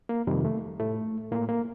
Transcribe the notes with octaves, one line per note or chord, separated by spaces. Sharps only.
A#3
F2 C3 D#3 G3
A3
A2 A3
A2 A#3
A#3